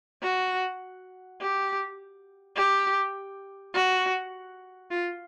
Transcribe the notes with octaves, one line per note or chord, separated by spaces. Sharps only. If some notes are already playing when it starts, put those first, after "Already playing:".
F#4
G4
G4
F#4
F4